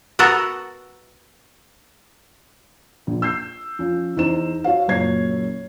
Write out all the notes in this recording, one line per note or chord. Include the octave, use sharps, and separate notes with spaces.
B3 F#4 A4 A#4 F#5
A#1
E6 G6 C7
F3 C#4
E2 D#4 C5 E7
F#4 C#5 F5
F#1 F#2 A#2 C#5 G#6 C7